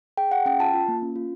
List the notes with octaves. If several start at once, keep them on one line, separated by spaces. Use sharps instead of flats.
G#4 G5
G#4 F#5
C#4 G5
F4 A5
F4
A#3
C#4
F4